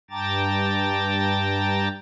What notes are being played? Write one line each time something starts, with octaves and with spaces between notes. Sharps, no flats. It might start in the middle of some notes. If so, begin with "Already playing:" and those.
G2 G5 A5 A#5 D6 A6